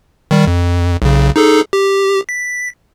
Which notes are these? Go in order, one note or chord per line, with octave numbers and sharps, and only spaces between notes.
D#3 G3
F2
B1 C#3
D#4 G#4 A4
G4
B6